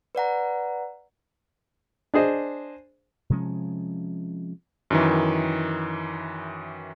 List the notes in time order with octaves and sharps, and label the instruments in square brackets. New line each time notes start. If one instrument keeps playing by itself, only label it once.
[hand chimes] B4 D5 F#5 A#5
[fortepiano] D4 G#4 C5 D#5
[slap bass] C3 F3 G#3 C#4
[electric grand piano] F#2 D#3 E3